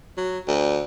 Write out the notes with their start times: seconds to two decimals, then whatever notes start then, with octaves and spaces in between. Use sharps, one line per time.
0.17 F#3
0.48 D2